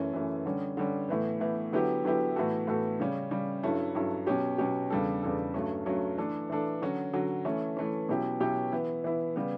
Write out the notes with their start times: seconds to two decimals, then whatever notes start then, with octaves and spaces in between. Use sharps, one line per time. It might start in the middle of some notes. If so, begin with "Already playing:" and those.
Already playing: F#2 E3 A3 C#4
0.13 F#2 E3 A3 C#4
0.45 D3 G3 C#4
0.77 D3 G3 C#4
1.09 A2 E3 B3
1.40 A2 E3 B3
1.72 D3 F#3 B3 E4 G4
2.04 D3 F#3 B3 E4 G4
2.36 A2 E3 B3 F#4 A4
2.67 A2 E3 B3 F#4 A4
3.00 C#3 G3 C#4
3.31 C#3 G3 C#4
3.63 G2 F#3 C#4 E4 A4
3.95 G2 F#3 C#4 E4 A4
4.27 B2 F#3 C#4 G4
4.58 B2 F#3 C#4 G4
4.90 E2 C#3 G3 D4 A4
5.23 E2 C#3 G3 D4 A4
5.54 G2 F#3 A3 C#4
5.86 G2 F#3 A3 C#4
6.18 E3 A3 D4 A4
6.50 E3 A3 D4 A4
6.81 D3 F#3 C#4 F#4
7.13 D3 F#3 C#4 F#4
7.45 E3 A3 C#4
7.77 E3 A3 C#4
8.09 B2 F#3 C#4 E4 G4
8.40 B2 F#3 C#4 E4 G4
8.72 E3 B3 E4
9.04 E3 B3 E4
9.36 C#3 G3 B3